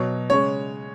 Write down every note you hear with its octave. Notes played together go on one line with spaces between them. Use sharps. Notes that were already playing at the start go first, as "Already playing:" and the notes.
Already playing: B2 F#3 C#5
C#3 G#3 C#5